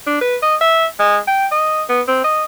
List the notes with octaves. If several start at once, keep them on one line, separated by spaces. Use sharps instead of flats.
D4
B4
D#5
E5
G#3
G5
D#5
B3
C4
D#5